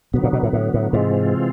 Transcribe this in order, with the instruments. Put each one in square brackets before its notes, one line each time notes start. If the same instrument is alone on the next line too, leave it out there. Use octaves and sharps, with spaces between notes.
[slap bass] B2 [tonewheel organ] D3 F#3 B3
[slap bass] A#2
B2
A2
A2
A2
[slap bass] G#2 [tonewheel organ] C3 E3 G#3 C4 F4